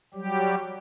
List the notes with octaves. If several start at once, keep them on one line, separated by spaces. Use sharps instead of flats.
F#3 G3 G4